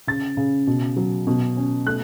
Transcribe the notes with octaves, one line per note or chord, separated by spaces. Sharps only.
C#3 A6
C#3
B2
F#3
B2
C#4
A3 F#6